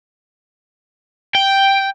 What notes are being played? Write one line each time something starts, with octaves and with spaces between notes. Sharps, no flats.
G5